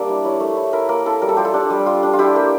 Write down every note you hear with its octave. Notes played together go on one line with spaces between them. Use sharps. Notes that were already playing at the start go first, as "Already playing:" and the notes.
Already playing: G3 A#3 D4 D5 E5
E4
E4 C#5
A3
E4
E4 A#4
A#3 A#4
E4 A4
G3 A#4
A4
F4 G4
A4
D4
G3
F4
D4
F4
E4 G4
A#3